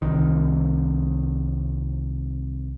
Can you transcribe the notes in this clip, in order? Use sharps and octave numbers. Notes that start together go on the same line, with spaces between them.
C2 D#3